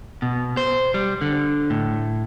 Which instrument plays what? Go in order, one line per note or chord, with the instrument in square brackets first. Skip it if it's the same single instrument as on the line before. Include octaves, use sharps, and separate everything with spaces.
[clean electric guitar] B2
C5
G3
D3
A2